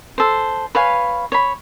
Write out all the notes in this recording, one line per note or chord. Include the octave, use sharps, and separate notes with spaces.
A4 C5
B4 C#5 F5 G#5
C#5 B5